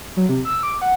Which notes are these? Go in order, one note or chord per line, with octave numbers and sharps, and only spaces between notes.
F#3
C3
E6
D6
F#5